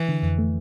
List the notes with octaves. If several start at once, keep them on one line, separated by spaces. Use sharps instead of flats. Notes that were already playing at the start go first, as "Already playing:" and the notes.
Already playing: E3
D3
F2
A3